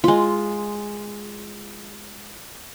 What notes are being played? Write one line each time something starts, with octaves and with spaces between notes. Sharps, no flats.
G#3 F4